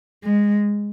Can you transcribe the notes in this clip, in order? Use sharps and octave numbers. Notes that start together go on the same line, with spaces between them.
G#3